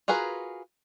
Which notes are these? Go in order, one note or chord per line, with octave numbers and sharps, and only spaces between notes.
F4 F#4 G#4 A#4 B4